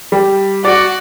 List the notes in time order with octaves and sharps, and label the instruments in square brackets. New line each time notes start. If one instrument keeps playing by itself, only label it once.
[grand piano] G3
[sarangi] F#4 [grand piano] D5 D6